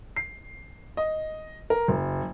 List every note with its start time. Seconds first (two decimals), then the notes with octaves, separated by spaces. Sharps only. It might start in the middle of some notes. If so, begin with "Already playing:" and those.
0.16 C7
0.97 D#5
1.70 A#4
1.88 F#1